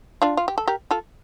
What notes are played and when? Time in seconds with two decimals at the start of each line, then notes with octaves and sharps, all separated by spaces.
0.22 D4 F4
0.37 F4
0.48 G4
0.58 A4
0.68 G4 A#4
0.91 F4 A4